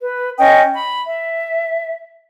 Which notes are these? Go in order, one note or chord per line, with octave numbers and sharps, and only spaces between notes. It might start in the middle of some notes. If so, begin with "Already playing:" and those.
B4
C#4 D#5 G5 D#6
B5
E5